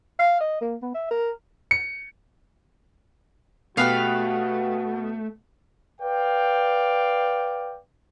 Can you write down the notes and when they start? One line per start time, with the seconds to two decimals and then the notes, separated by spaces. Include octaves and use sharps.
0.19 F5
0.40 D#5
0.61 A#3
0.82 B3
0.94 E5
1.11 A#4
1.71 C#7
3.77 B2 A3 B3 F#4 G4 B4 F5 C7
6.01 B4 D5 F5 G5